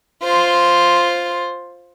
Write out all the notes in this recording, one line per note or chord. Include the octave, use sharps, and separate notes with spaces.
F4 C5